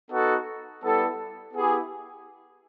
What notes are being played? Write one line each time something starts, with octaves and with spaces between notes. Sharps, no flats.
B3 D#4 F#4 A4
G3 B3 E4 A4
B3 E4 G4 G#4